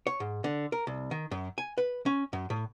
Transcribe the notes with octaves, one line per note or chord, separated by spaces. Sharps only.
C#5
G#2
D3
A#4
C2
D#3
F#2
G#5
B4
C#4
F#2
A2